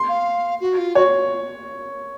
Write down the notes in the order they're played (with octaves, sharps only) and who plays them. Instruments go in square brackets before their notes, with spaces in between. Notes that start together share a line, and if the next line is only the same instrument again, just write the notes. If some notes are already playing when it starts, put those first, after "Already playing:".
Already playing: [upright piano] C6
[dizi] F5
F#4
F4
[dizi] F#4 [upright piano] C#5